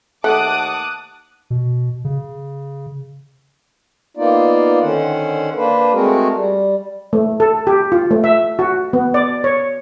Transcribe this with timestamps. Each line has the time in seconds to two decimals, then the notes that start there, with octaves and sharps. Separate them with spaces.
0.24 D#2 A3 F#5 A5 D6 D#6 F#6
1.50 B2
2.05 C#3
4.17 A#3 B3 D#4 F4 D5
4.82 D3 D#3 C#4 C5 F#5
5.56 A#3 D4 B4 C5
5.93 G#3 A3 C4 F#4 G#4 A#4
6.34 G3
7.13 A3
7.40 A4
7.67 G4
7.92 F4
8.11 A3
8.24 E5
8.59 F#4
8.93 B3
9.14 D5
9.44 C#5